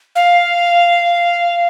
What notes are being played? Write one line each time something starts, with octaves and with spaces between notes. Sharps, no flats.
F5